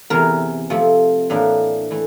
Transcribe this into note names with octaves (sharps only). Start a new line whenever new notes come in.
E2 C3 E3 A#4 A#5
C3 F3 A3
A2 E3 A#3 D4
E3 A3